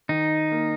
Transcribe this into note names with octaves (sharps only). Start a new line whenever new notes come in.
D#3 D#4
A#3